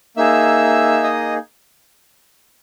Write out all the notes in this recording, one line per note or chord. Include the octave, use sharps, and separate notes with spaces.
A#3 D#4 G#4 E5 E6
D#5 D#6